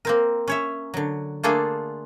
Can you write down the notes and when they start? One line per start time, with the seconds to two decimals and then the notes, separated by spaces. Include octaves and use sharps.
0.05 A#3 C4 A#4
0.48 C#4 C#5 E5
0.94 D3 F#3
1.44 A3 A#3 D4 F4 G#4 A4